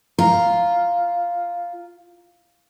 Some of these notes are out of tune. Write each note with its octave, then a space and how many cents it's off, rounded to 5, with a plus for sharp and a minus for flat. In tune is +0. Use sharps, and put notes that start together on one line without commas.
F4 +0 A#5 +0